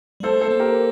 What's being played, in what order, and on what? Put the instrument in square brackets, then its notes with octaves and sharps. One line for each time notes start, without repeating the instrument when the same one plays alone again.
[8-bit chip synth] G3
[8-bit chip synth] A3 [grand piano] A4 C5
[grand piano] A4 C5
[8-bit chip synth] A#3
[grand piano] G4 A#4